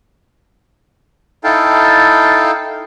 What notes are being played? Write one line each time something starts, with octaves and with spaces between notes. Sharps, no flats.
D#4 E4 A4 F5 G5 A5